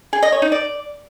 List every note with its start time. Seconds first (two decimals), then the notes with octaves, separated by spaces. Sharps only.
0.13 G#4
0.23 D#5
0.32 C#5
0.42 D#4
0.52 D5